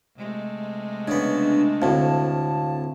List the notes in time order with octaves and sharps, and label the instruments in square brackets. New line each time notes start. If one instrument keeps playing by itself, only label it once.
[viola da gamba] C3 G#3 A3
[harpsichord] C#3 B3 [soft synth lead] D4
[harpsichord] D2 A2 [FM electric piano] C4 F5 [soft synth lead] A5